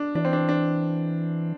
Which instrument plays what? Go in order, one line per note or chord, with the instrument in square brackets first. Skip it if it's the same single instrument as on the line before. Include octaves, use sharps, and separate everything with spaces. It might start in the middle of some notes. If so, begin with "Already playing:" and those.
Already playing: [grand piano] D4
[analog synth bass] E3 [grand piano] D4
[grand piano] C4
D4
D4